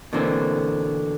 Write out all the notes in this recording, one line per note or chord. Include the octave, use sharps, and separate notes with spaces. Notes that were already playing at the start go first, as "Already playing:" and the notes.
B2 D3 E3 A#3 C4